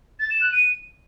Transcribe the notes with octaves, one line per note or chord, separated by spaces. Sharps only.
A6
E7
F#6
D#7